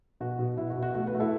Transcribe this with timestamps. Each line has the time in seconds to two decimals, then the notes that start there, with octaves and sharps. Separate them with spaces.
0.20 B2 F#4
0.39 B2
0.57 B2 E4
0.70 F#4
0.77 B2
0.83 F#4
0.94 A3 F#4
1.07 F#4 B4
1.14 A3
1.20 E4 A4